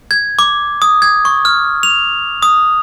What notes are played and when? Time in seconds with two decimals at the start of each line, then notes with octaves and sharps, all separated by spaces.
0.11 G#6
0.39 D6
0.82 D#6
1.02 G#6
1.25 C#6
1.45 F6
1.83 F7
2.43 D#6